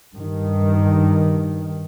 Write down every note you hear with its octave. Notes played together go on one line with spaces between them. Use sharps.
G2 D#3